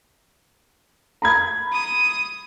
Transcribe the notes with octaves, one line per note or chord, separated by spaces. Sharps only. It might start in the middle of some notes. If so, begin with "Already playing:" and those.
A#5 B5 G#6
D#6